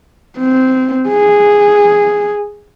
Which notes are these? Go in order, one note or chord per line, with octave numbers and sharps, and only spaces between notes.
C4
G#4